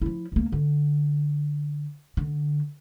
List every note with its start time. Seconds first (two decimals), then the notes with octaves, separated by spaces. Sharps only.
0.02 F3 E4
0.32 C#2 A#3
0.52 D3
2.17 D3